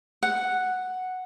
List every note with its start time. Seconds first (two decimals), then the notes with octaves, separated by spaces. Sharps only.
0.23 F#5